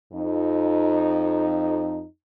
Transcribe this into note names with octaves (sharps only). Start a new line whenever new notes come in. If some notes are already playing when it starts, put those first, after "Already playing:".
F2 D#4